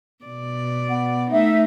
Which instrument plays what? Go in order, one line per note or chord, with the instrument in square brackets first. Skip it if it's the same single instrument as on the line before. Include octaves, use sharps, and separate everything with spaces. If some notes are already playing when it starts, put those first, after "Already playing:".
[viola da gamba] B2 D5
[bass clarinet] B3
[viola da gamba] A3 D#4 [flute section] E5